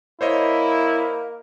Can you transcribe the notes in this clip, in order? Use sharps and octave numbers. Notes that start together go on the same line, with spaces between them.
A#3 E4 C5 C#5 D#5